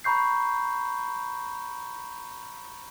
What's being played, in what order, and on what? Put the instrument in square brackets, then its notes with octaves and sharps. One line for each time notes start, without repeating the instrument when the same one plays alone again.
[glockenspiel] A#5 B5 C#6 G6 C7